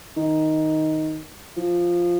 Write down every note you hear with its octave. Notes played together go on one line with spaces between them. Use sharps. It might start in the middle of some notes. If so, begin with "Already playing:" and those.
D#3
F3